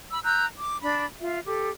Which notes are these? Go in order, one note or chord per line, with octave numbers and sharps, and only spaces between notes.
B5 E6
A#5 E6 F#6 G6
D6
D4 B5
F4 E5
G4 A4